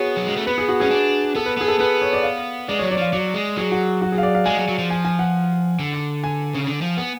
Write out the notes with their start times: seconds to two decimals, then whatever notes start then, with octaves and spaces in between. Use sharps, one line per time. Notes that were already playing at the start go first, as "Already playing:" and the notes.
Already playing: B3 F#4 G#4 C#5
0.17 F#3
0.27 G#3
0.36 A3
0.46 B3 B4
0.58 G#4
0.69 F#4
0.80 C#4 G#4
0.90 D4
1.35 B3 A4
1.46 B4
1.57 B3 G#4
1.68 A4
1.79 B3 B4
2.02 C#5
2.13 D5
2.23 F5
2.68 G#3 D5
2.79 C#5
2.83 F#3
2.91 D5
2.98 F3 F5
3.13 F#3 D5
3.34 G#3
3.57 F#3 G#4
3.72 F#4
4.02 F#4
4.12 G#4
4.18 F5
4.23 D5
4.35 F5
4.45 G#3 G#5
4.57 F#3
4.68 F#3
4.79 F3
4.90 G#5
5.05 G#5
5.19 F#5
5.79 D3
6.24 G#5
6.55 C#3
6.67 D3
6.82 F3
6.97 B3